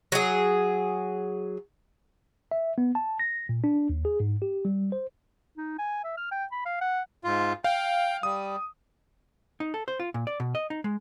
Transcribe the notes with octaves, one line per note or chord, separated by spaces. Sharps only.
F#3 G#4
E5
B3
A5
A#6
A#2
D4
D#2
G#4
G#2
G4
G3
C5
D#4
G#5
E5
F6
G5
B5
F5
F#5
G#2 F4
F5 G5
G3 D#6
D#4
A4
C5
F4
A#2
D5
B2
D#5
D#4
G#3